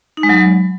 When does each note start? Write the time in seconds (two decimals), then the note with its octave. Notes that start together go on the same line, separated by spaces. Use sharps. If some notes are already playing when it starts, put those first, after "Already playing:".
0.17 D#4
0.23 G#3
0.29 F#3